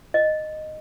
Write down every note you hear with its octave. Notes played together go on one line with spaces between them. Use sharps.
D#5